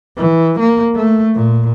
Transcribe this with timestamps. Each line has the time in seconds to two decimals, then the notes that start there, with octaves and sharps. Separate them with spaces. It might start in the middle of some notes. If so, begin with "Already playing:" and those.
0.17 E3
0.59 A#3
0.95 A3
1.35 A#2